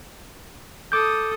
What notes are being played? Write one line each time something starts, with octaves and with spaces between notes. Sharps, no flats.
A4 D6 D#6 G6